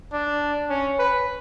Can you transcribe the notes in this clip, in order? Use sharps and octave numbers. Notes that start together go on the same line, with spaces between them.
D4
C#4
B4